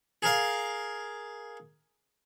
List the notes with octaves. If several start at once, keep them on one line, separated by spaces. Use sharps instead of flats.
G#4 A#4 F5